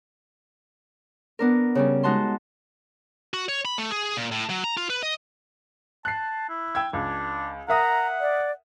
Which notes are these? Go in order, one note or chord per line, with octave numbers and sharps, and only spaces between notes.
B3 D4 A#4
C#3 G3 C#4
G#3 D#4 F#4 A5 C6
F#4
C#5
B5
A3
G#4
A#2
A2
F#3
A#5
F4
B4
D#5
A5 F#6 C7
E4
G5 E6 G#6
C#2 D4
A#4 E5 F#5 A#5 D#6
D5